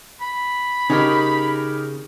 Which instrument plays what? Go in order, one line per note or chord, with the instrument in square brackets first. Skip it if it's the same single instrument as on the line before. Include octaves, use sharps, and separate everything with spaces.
[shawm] B5
[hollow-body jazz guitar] C#3 [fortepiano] D#4 G4 A#4